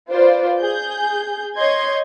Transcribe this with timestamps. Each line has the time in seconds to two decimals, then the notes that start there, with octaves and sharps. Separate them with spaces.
0.11 F4 B4 C5 D5
0.60 G#4 G6
1.56 C#5 D#5 C6 G6 G#6